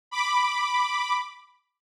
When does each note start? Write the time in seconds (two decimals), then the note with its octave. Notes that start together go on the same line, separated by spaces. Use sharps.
0.11 B5 D6